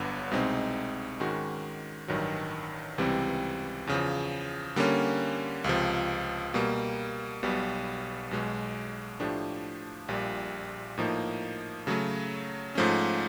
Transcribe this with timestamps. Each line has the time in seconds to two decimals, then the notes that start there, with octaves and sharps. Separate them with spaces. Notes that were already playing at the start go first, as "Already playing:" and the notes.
Already playing: G1 G2 D3 F#3 B3
0.31 C2 B2 G#3 C4 D#4
1.20 G#2 D#3 G#3 C#4 F#4
2.08 A1 G2 D#3 F#3
2.98 C#2 C3 E3 G3 C4
3.87 E2 C#3 F3
4.76 D3 G3 A#3 C#4
5.64 C#2 C3 F3
6.54 B2 G3 A#3
7.43 B1 B2 G3 B3
8.31 B1 B2 G#3
9.20 A2 F3 A3 D4 G4
10.08 A#1 A#2 G3
10.98 A2 F3 A#3 D#4
11.87 C#3 F#3 A3
12.75 G#2 F3 A3 C#4